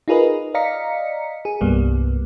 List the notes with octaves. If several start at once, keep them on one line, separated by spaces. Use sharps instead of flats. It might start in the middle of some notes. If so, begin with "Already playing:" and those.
D#4 F4 G#4 A#4 B4 D#5
D5 D#5 F5 A#5 B6 C#7
G#4
C2 G2 G3 A#3 B3